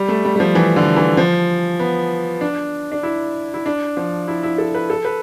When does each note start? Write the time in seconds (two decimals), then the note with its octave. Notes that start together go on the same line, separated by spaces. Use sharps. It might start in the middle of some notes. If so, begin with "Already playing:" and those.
Already playing: G3
0.08 A3
0.25 G3
0.36 G3
0.40 F3
0.55 E3
0.76 D3
0.96 E3
1.17 F3
1.79 B3
2.41 D4
2.92 D4
3.03 E4
3.54 E4
3.66 D4
3.97 F3
4.28 E4
4.43 E4
4.58 A4
4.75 B4
4.90 A4
5.05 B4